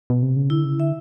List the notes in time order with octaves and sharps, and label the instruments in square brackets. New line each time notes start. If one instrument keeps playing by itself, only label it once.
[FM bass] B2
C3
C#3
[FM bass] D3 [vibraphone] E4
[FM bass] C#3
[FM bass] D3 [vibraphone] E5